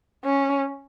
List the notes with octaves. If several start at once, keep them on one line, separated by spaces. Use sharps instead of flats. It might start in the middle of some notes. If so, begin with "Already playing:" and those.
C#4